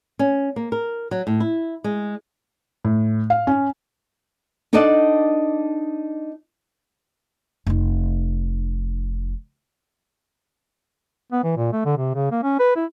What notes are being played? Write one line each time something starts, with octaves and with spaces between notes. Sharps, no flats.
C#4
A#3
A#4
F#3
A2
E4
G#3
A2
F5
C#4
D4 D#4 A4 D5 D#5 F#5
F1 D#4
B3
E3
A#2
A3
D3
C3
C#3
A#3
C#4
B4
E4